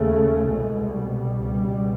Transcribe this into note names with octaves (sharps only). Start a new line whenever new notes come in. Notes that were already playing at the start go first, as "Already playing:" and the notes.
Already playing: D#2 C#3 A3
C2 B2 G#3
G3
C#2 B2